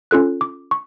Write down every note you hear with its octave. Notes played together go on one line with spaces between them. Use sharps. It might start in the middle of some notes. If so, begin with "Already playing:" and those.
C#4 F4 A4 F#6
D6
C#6